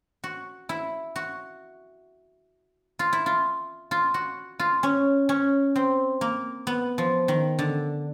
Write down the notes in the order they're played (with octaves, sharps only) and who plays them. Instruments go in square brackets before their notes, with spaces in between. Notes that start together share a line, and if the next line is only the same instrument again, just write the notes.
[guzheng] F#4
E4
F#4
F4
E4
F4
F4
F#4
F4
C#4
C#4
C4
A#3
B3
F3
D#3
D3